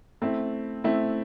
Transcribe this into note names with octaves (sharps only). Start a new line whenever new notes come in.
A3 C4 E4
A3 C4 E4